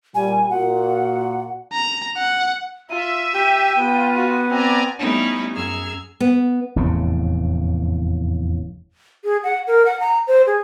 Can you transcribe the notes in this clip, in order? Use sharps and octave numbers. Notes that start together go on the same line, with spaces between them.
A#2 G3 G#5
A#2 F#4 F#5
A#5
F#5
F4 E5 D#7
G4 G5
B3 F4
F#4
C4 D5 G#5 A#5
G3 A3 B3 C#4 D#4 E4
F#2 G#4 A#5 E6 F6 G#6
B3
F1 E2 A2 C#3
G#4
F#5
A#4
F#5
A#5
C5
G#4